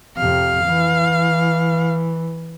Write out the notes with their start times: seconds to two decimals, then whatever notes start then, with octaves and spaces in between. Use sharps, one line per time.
0.17 F2 C3 F5
0.66 E3